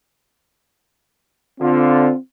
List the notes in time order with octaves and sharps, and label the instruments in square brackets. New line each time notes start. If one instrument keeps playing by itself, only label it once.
[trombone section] D3 F4 [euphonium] C4